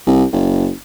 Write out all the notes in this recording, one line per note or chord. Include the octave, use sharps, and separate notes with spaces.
C2
F#1